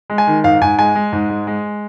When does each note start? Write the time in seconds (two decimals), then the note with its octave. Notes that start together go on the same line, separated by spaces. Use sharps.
0.10 G#3
0.18 G#5
0.27 D#3
0.44 G#2 F5
0.61 G#2 G#5
0.79 G#3 G#5
0.95 G#3
1.13 G#2
1.30 G#3
1.47 G#3